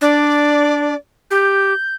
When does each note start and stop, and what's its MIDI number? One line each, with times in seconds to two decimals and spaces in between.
0.01 0.94 62
0.01 0.95 74
1.31 1.73 67
1.31 1.95 91